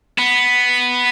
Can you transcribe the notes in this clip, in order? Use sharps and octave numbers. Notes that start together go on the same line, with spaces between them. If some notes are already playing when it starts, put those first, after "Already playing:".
B3